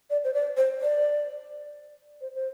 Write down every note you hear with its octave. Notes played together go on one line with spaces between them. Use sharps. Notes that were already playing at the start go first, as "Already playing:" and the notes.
D5
C5
D5
C5
D5
C5
C5